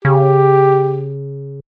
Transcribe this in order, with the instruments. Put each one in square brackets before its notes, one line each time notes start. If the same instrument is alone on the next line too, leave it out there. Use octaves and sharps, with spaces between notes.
[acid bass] C#3 [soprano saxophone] G4